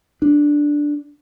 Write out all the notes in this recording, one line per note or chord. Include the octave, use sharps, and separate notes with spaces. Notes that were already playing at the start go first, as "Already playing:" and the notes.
D4